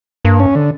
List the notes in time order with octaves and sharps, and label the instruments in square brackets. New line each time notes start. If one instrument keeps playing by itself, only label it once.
[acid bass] G2 [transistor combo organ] A#3
[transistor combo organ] C#4
D3